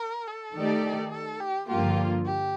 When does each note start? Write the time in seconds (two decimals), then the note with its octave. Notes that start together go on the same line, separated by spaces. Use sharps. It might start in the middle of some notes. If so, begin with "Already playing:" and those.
Already playing: A#4
0.28 A4
0.56 D#3 A3 D#4 G4 D5
1.12 A4
1.40 G4
1.69 G2 D3 F3 A#3 F4 G4
2.26 G4